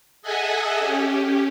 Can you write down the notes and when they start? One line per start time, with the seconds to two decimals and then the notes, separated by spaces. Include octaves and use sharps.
0.22 G#4 A4 D#5 E5 F#5 G#5
0.80 C#4 G4